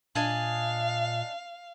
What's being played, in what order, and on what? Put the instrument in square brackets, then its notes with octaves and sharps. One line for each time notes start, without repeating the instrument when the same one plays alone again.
[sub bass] A#2 [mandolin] D4 D#5 G#5 [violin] F5